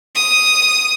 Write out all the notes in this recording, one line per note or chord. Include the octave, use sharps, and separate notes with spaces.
D#6